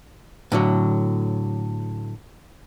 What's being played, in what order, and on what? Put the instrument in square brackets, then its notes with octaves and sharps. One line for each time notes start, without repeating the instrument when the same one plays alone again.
[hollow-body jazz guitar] A2 D3 F#3